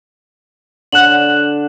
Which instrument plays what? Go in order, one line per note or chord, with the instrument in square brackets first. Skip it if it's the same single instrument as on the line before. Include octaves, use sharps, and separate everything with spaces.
[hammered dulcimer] D3 [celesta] F#6 E7 F#7